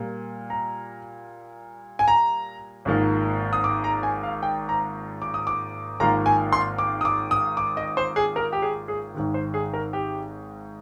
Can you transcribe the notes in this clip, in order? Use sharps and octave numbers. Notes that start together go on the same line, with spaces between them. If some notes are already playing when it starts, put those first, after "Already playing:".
Already playing: A#2 G3 A#3
A#5
G#5
A#5
G#1 G#2 F3 A#3
D#6
D6
A#5
G#5
F5
G5
A#5
D6
D#6
D6
G#1 G#2 F3 A#3 F4 A#5
G#5
C6
D6
D#6
D6
D#6
D6
D#5
C5
G#4
A#4
G4
G#4
G#4
G#1 G#2 D#3
C5
G#4
A#4
G4